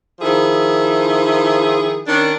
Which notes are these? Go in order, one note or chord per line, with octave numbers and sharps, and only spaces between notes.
D#3 F3 E4 G#4
D#3 C#4 D4